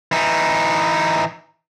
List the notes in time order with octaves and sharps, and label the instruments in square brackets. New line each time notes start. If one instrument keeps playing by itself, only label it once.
[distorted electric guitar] E3 D#4